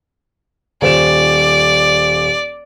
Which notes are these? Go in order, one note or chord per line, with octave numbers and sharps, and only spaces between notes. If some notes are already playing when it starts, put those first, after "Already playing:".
D#1 C5 D5 E7